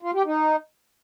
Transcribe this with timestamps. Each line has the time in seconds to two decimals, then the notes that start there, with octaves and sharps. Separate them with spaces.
0.02 F4
0.14 G4
0.26 D#4